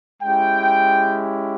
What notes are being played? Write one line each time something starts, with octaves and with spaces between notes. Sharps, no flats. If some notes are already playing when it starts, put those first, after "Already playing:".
G#3 C#4 E4 G4 G5